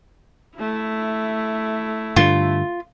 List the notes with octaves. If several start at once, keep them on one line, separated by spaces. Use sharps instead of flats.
A3 E4
G2 D3 F4